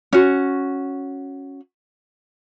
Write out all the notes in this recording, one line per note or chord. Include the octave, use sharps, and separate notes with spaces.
C#4 F#4